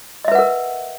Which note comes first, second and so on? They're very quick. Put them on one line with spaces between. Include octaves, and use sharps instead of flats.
D#5 E5 B4 F#5 A#4